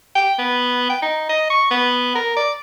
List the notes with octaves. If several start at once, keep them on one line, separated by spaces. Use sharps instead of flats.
G5
B3
G5
D#4
D#5
C#6
B3
A#4
D5